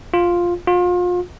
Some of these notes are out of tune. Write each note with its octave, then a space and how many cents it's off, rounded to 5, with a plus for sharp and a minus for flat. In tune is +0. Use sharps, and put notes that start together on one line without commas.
F4 +5
F4 +35